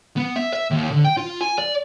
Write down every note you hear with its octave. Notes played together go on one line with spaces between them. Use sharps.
B3
E5
E5
D#2
D3
G5
F4
G#5
D5